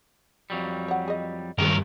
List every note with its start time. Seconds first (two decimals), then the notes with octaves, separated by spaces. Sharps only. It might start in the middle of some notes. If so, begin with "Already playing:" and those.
0.50 F2 F#3 G3
0.88 C#5 F#5
1.08 G#4 D#5
1.58 G2 D#3 F#3 C4 G#4 A#4 D5